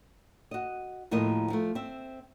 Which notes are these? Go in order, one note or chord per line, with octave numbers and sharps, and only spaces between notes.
F#4 D#5
D#2 A2 F3 A#4 D#5
F3 A3
C4 E5